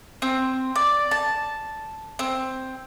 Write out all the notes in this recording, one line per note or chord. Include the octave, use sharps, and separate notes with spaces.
C4
D5
A5
C4